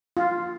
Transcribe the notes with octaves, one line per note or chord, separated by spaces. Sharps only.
F4